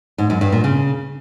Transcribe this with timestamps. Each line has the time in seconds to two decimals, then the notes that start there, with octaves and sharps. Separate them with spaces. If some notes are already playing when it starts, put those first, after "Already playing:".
0.18 G#2
0.30 F#2
0.41 G2
0.52 A#2
0.64 C#3